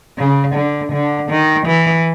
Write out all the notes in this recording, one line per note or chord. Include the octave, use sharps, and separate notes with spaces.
C#3
D3
D3
D#3
E3